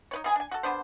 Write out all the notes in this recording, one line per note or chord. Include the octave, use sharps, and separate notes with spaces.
D#4 B4 C#5
B2 G#4 G#5
D4 G#5
F#4 A4
D3 B3 D4 C5